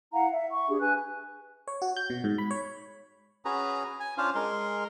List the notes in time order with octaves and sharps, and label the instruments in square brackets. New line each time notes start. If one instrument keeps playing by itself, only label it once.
[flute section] E4 F5 F#5 A#5
E5
C#6
D4 G4 G#4
B4 G#5 F#6
[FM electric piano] C#5
F#4
G6
B2
G#2
B5
C#5
[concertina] C#4 F#4 G#4 B4 A#5
G#5
C#4 D4 F4 C5 F5
G#3 A#4 C6